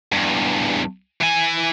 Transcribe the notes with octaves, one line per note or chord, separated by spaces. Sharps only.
E2 G2
E3 G#5